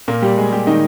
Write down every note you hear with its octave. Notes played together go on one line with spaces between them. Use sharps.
A#2 A#3
G3 G4
G#3 G#4
G3 G4
D#3 D#4